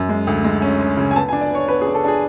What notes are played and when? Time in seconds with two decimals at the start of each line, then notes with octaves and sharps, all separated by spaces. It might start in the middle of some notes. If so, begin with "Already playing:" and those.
Already playing: F#2
0.09 G#3
0.27 D2
0.44 G#3
0.62 C#4
0.81 C#4
0.97 C#3
1.11 G#5
1.16 B3 A5
1.29 G#5
1.33 D4
1.41 D5
1.50 B3 C#5
1.68 B3 B4
1.82 G#4
1.87 D4
1.95 A4
2.04 D4 G#4